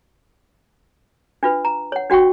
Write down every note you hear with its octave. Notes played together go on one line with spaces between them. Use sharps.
D4 F4 B4
A#5
C#5 F#5
D4 F#4 F#5 G5 C#6